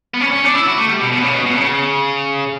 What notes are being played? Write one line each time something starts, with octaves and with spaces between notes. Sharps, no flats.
B3
C#4
C#4
D4
E4
F#4
A3
G3
B2
B2
C#3
B2
B2
C#3